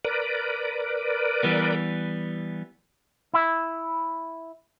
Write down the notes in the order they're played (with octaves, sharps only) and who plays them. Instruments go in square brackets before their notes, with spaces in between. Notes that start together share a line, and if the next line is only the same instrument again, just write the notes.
[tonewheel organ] A#4 B4 D5
[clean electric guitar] E3 G3 B3
E4 E5